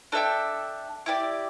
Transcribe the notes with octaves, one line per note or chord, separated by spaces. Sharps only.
D4 A4 E5 G5
E4 G4 D5